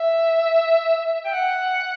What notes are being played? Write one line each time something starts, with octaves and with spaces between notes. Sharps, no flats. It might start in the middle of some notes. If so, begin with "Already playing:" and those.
Already playing: E5
G5
F#5